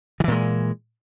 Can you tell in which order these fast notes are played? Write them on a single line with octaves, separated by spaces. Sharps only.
D#3 E3 A#2 G#3